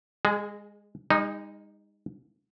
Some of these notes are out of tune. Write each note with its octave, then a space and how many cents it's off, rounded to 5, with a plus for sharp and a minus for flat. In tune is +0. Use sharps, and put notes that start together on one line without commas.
G#3 -20 G#4 +20
G#3 -45 D#4 +0